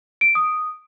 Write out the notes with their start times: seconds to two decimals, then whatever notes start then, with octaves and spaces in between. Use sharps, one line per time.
0.21 D7
0.35 D#6